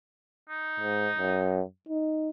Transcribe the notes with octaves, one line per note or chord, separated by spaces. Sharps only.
D#4
G#2
F#2
D#4